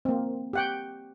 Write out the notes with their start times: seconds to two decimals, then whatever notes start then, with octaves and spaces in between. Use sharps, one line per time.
0.05 A#3 C4
0.53 G4 F#5 G5